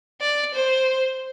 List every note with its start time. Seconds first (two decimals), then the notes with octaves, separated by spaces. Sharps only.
0.21 D5
0.54 C5